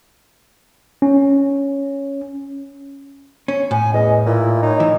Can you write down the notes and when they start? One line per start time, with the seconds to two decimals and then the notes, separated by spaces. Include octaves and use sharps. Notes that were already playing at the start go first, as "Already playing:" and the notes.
1.02 C#4
3.48 C#4
3.71 A2 G#5
3.93 E2 D#5
4.26 A#2 E4
4.63 D#4 C#5
4.80 E3